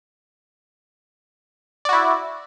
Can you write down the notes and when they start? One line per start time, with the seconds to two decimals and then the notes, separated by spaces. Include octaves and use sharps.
1.85 D5
1.89 F#4
1.93 E4